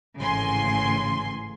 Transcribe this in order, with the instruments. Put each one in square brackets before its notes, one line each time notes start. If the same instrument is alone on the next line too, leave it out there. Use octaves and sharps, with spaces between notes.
[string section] G#1 A2 C#3 E3 G#5 C6